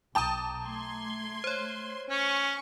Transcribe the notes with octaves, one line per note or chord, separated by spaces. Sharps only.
B1 G5 A5 A#5 D6 D#6
A3 C6 G#6
C5 C#5
C#4 G#5 C#6